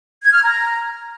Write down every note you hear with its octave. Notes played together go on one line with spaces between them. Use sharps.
G#6
F6
A#5